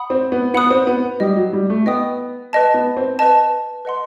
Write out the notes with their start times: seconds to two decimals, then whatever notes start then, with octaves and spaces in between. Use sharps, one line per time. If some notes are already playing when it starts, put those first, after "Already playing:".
Already playing: F#5 B5 D#6
0.10 C4
0.32 B3
0.54 B3 F#5 B5 D#6 F#6
0.71 C4
0.87 B3
1.20 G3 D#5 G5 D#6
1.37 F#3
1.53 G3
1.70 A3
1.86 B3 D#5 G5 D#6
2.53 B4 D#5 A5
2.74 B3
2.97 C4
3.19 B4 D#5 A5
3.85 B4 D#5 F#5 C6